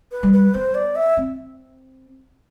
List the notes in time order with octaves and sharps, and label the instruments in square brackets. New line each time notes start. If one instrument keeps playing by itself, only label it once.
[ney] B4
[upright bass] G3
[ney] B4
[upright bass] B3 [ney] C5
[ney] D5
E5
[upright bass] C4